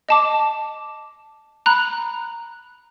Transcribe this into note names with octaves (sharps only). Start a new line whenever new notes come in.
D#5 A5 D6
A#5 B5 F#6